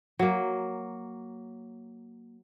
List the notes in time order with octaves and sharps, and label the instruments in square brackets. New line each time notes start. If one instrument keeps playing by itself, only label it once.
[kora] F#3 A#3